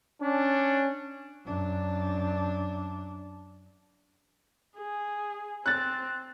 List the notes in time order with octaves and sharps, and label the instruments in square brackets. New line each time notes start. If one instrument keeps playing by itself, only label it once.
[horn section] C#4 D4
[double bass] F#2 D4
[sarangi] G#4
[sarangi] C4 [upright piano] F#6 A6